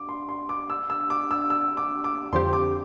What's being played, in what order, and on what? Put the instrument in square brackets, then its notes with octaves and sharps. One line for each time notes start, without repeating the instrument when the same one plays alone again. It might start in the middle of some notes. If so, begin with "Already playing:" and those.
Already playing: [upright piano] D6
C6
C6
D6
E6
E6
D6
E6
E6
D6
D6
[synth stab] F2 D3 F3 C4 G4 [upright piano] C6
[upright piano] D6